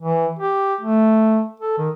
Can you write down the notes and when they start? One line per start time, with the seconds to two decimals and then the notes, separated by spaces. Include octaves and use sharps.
0.01 E3
0.39 G4
0.81 A3
1.60 A4
1.78 D#3